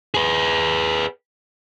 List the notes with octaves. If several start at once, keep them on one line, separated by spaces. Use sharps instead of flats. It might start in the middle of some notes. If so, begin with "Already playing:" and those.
G#4 B4